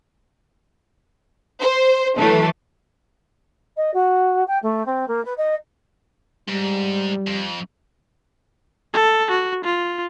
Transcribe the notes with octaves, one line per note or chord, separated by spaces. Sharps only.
C5
E3 F#3 A3
D#5
F#4
G5
A3
C4
A#3
B4
D#5
G#2 G3
F2
A4
F#4
F4